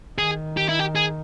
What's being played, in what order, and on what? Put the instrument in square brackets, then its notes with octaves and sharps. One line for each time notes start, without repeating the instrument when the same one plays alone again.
[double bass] D#3 [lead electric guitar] G#4
[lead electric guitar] G4
E4
G4
G#4